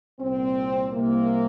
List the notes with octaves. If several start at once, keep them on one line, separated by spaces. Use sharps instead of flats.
C2 A#2 C4
C2 C3 A#3